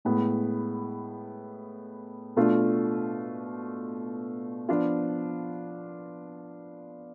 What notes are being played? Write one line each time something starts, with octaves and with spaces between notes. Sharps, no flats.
A2 G#3 B3
B2 A3 D4 F4
F3 B3 D4 F4